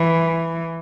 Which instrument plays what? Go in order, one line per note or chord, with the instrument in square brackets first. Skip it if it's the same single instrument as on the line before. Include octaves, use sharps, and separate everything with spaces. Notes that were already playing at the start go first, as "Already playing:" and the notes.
Already playing: [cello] E3